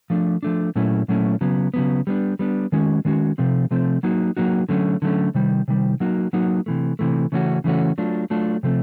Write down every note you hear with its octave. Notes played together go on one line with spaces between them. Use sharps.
F3 A3 D4
F3 A3 D4
A#2 F#3 A3 C#4 E4
A#2 F#3 A3 C#4 E4
C#3 F#3 B3
C#3 F#3 B3
G3 B3 D4
G3 B3 D4
D#3 G#3 C#4 F#4
D#3 G#3 C#4 F#4
C3 F3 A3 C4
C3 F3 A3 C4
F#3 A#3 D#4 F#4
F#3 A#3 D#4 F#4
D3 F#3 A3 C#4
D3 F#3 A3 C#4
C3 D#3 G3
C3 D#3 G3
F#3 A#3 D#4 F#4
F#3 A#3 D#4 F#4
C3 E3 A3
C3 E3 A3
C#3 E3 A3 C#4 F#4
C#3 E3 A3 C#4 F#4
F#3 A3 D4 F4
F#3 A3 D4 F4
C3 F3 A3 C4